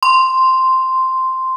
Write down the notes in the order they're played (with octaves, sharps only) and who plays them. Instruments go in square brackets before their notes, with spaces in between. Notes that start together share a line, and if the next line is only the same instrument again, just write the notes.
[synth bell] C6